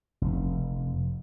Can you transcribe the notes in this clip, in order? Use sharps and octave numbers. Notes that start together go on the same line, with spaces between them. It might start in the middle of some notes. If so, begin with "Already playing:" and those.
F1